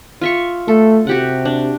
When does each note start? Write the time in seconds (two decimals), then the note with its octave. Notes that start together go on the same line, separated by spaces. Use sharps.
0.21 F4 E5 C#6
0.68 A3 A4
1.07 C3 F#4 G4 F#5
1.45 D4